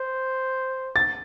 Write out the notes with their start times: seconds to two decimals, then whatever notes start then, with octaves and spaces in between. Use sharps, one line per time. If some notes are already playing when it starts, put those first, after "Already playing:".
Already playing: C5
0.96 A6